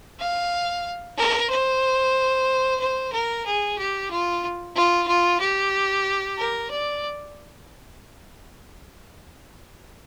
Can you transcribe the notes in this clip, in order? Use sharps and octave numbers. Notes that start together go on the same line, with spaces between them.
F5
A#4
C5
C5
A#4
G#4
G4
F4
F4
F4
G4
A#4
D5